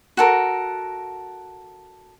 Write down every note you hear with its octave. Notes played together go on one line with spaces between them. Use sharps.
F#4 A4 A#4